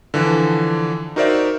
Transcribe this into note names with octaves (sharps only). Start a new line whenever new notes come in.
D3 E3 F3 D4
D#4 F#4 A#4 C5 D5 E5